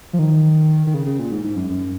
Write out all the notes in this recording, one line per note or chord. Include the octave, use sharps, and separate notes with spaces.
F3
D#3
D#3
C#3
C#3
A#2
G#2
G#2
F#2
F#2